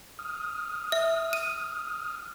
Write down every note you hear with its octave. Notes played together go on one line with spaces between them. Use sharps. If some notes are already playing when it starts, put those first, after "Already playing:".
D#6 F6
E5
D#7